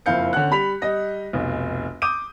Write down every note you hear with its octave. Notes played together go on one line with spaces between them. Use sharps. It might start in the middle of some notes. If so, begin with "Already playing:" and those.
F#1 F2 E4 F5 G6 C#7
D3 C#4 F#5 F#6
G3 B5 B6 F7
G3 D#5 A#6
F1 B1
D6 D#6 G6 D#7